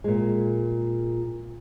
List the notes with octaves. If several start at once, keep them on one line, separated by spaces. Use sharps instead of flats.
A#2 G#3